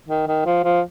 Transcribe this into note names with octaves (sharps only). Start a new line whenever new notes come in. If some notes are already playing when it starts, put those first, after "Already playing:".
D#3
D#3
F3
F3